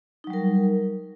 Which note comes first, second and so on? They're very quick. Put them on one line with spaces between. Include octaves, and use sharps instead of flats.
D#4 F#3 G3 A#4